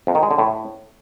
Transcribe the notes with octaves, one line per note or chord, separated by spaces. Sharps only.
F2
D#3
G#3
D3
A2